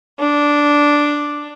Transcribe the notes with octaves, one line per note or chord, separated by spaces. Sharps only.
D4